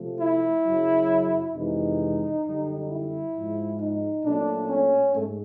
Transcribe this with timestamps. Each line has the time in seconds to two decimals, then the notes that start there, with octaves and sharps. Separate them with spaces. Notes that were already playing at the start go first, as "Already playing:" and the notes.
Already playing: C3 F3 A3
0.18 E4
0.63 F#2 C#3 F#3
1.53 F2 C3 E3 G#3 D#4
2.44 F#2 D3 G3
2.89 E4
3.35 G#2 F3 G#3
3.79 D#4
4.24 A#2 F#3 A3 D4
4.69 C#4
5.14 G#2 A3